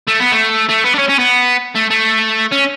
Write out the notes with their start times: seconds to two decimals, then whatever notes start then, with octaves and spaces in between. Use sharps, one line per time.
0.07 A3
0.19 B3
0.31 A3
0.69 A3
0.84 B3
0.94 D4
0.98 C#4
1.09 C#4
1.19 B3
1.75 A3
1.91 A3
2.51 C#4